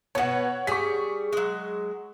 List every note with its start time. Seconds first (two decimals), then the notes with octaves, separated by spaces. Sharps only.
0.15 B2 B3 C#5 F#5
0.67 G3 G#4 C#6 B6
1.33 F#3 G#3